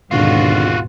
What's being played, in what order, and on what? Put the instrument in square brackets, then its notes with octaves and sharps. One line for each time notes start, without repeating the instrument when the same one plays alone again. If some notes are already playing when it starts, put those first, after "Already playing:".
[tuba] G#1 [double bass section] D#2 G#2 B2 [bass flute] D3 [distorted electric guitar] F4 F#4